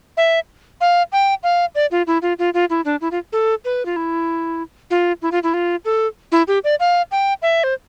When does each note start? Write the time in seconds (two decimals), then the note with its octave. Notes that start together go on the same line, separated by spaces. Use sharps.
0.17 E5
0.81 F5
1.12 G5
1.43 F5
1.75 D5
1.91 F4
2.07 E4
2.22 F4
2.39 F4
2.54 F4
2.70 E4
2.85 D4
3.01 E4
3.11 F4
3.33 A4
3.65 B4
3.86 F4
3.96 E4
4.90 F4
5.22 E4
5.32 F4
5.43 E4
5.54 F4
5.85 A4
6.32 E4
6.48 G4
6.64 D5
6.80 F5
7.11 G5
7.42 E5
7.64 C5